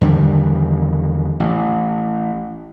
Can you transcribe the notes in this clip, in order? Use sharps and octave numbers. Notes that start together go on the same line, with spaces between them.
E2 D3 D#3 G3
A1